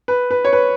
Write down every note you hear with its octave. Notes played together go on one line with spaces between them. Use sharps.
B4
B4
C#5
B4